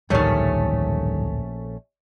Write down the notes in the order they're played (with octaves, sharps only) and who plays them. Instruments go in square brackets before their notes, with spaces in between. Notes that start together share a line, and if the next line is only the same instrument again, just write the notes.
[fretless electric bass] D1 [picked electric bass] A#1 [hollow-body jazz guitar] G2 D#3 [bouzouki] A3 C#4